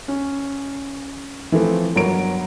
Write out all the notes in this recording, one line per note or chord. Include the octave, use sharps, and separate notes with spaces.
C#4
E3 F3 A3 C4
G1 F#3 A#4 D7